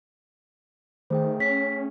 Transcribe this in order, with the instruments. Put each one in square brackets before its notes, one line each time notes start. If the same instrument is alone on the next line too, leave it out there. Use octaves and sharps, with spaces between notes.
[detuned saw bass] D#3 [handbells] A3 G#4 G5 [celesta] C5
[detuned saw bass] C#4 [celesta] C#5 B6